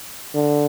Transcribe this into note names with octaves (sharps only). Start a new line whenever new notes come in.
D3